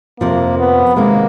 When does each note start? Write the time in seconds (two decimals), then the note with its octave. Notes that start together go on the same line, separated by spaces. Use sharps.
0.20 F2 C3 F3 A#3
0.59 B3
0.96 C3 D#3 G#3 A#3